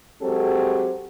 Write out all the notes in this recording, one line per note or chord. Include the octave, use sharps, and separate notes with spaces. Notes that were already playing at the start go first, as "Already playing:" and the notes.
F#3 G#3 C4 G4 A4 C5